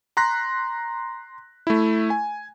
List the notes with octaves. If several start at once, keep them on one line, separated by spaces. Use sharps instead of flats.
A#5 C6 F#6 A#6 B6
A3 E4
G#5